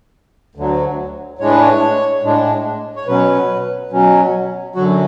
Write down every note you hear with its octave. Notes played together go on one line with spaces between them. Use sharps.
D2 D3 F#3
A2 G#3 D4 C#5
B4
C#5
A2 G#3 D4
C#5
B2 F#3 C#4 B4
B2 F#3 C#4
F#2 D3 F#3 F#4